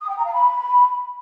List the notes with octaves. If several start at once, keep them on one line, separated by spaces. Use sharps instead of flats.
D#6
G5
A#5
F5
B5